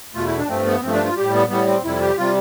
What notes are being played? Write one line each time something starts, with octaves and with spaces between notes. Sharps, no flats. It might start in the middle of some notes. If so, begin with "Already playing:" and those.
E2 B2 A3 F4
E4
D4
G2 F3 A3 C4
B3
G2 F3 A3 C4
D4
F4
A2 G3 G4
B3
A2 G3 B3
C4
F2 C3 G3 E4
G4
C3 G3 F4